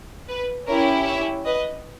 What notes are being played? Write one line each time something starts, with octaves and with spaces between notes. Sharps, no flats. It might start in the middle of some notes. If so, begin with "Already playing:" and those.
B4
C#4 E4 G4 A#4 C#5
C#5 E5
B4 D#5